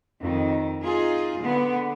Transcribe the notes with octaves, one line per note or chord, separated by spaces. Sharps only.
F2 D#3
D#4 F4 G#4
D3 B3